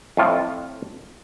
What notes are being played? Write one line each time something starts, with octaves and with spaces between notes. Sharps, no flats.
F2 A2 F4